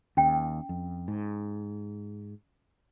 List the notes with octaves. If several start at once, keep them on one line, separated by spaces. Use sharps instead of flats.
D#2 C#4 G5
F2
G#2